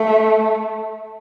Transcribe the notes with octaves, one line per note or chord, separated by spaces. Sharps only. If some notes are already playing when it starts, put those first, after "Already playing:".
Already playing: A3